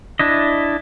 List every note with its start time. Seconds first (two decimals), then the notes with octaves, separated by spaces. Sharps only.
0.19 D4 E4 D#5